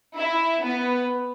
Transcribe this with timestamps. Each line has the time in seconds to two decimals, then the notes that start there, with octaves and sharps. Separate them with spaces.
0.16 E4
0.62 B3